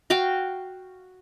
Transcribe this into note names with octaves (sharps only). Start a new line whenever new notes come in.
F#4 F5 G5